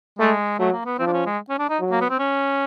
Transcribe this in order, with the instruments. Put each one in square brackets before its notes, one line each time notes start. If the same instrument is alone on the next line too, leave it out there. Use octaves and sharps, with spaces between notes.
[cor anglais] G#3 [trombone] A3
[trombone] F#3 [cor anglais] A3
[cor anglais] A#3
B3
[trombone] F3 [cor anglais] C4
[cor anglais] D4
C#4
G#3
C#4
D4
D#4
[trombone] F#3
[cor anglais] A#3
B3
C4
C#4